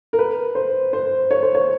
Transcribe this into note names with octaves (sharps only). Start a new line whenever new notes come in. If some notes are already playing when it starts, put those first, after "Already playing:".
A#4
B4
C5
C5
C#5
C5
C#5